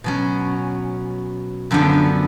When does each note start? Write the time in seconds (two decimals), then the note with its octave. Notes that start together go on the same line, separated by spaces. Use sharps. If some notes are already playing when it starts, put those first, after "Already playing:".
0.04 B2 F#3 C#4
1.71 F#2 D3 F3 B3 D4